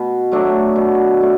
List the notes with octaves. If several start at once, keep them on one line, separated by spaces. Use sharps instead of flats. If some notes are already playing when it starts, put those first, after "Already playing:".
Already playing: B2
F#3 A3 D4
B2
A3 D4